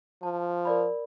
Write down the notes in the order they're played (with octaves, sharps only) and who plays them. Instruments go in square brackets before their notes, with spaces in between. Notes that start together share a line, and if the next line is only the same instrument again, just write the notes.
[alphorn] F3 [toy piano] A5
[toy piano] A#4 D5 B5